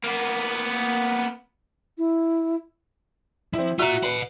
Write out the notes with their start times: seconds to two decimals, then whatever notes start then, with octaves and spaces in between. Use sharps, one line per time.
0.04 A#3 B3
1.98 E4
3.54 F3 C4 E4
3.79 F4 F#4 E5 A#5 E6
4.03 B4 D#5 F#5 B5